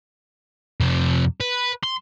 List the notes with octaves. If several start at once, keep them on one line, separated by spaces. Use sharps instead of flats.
F2 C3
B4
C6